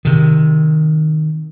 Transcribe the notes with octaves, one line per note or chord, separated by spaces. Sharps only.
C3 D#3